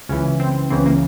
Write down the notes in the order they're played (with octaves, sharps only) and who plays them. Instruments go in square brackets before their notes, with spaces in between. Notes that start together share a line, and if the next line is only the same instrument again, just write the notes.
[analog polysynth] C#2 C#3 E3 C#4
C4
C#2 C#3 E3 C4
A#3